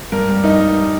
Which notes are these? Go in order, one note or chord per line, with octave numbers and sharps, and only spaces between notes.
G2 A#4
G3
G2 D#4
G3